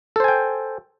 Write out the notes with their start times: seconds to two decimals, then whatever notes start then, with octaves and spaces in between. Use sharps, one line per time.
0.16 A4
0.20 C5
0.24 G#5
0.28 G5